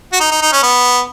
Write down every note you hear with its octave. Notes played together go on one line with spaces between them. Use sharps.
F#4
D#4
D#4
D#4
C#4
B3